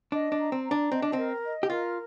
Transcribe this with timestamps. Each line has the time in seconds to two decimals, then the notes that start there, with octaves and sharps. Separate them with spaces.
0.12 D4 D#5
0.32 D4
0.38 A#5
0.52 C4
0.65 A#5
0.71 D4
0.91 C4 D#5
1.02 D4
1.13 C4 A#4
1.44 D#5
1.63 G4
1.70 F4 A#4